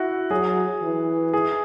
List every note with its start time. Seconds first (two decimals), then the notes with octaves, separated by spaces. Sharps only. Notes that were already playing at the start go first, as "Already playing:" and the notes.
Already playing: E4 F#4
0.31 F#3 G#4
0.82 E3
1.33 G#4